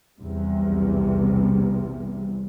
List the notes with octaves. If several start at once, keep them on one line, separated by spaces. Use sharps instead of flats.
B1 E2 C3 G3